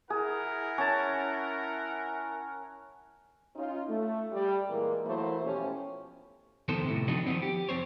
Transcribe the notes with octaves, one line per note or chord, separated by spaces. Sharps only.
E4 G#4 A#4 F#5
C#4 A5
C#4 D#4 F4
A3
G3
A#2 E3 G#3 A#3
E3 F#3 A3 A#3 E4 C5
B2 F3 A3 C#4 G4
F2 D#3 B3 A4 C5
A2 C3
F3 B3 C4 D4 D#4 F#4
D#3 F3 F#3 B3 C4
G4
F2 C4 C5 C#5